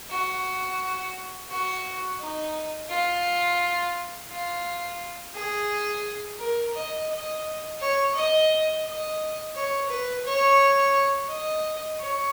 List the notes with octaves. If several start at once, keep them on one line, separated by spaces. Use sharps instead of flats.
F#4
F#4
D#4
F4
F4
G#4
A#4
D#5
D#5
C#5
D#5
D#5
C#5
B4
C#5
D#5
C#5